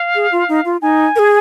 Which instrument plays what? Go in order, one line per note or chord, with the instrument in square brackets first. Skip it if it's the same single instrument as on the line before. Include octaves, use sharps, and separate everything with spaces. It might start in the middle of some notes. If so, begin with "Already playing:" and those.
Already playing: [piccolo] F5
[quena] G#4
F4
D#4
F4
[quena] D#4 [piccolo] G#5
[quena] A#4
G#4